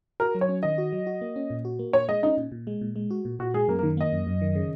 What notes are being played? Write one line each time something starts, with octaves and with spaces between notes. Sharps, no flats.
F#4 A#4
F#3
C#5
C#4
D#3 D#5
F#4
F#3
F#4
A#3
C#4
A#2
F#4
A#3
A#2 C#5
G#3 D#5
C#4 D#4
A#2
A#2
G#3
A#2
G#3
F#4
A#2
A#2 F#4
G#3 G#4
F#2 A#3
A#3
D#3
A#3 D#5
F#2
F#2
D#3
C#3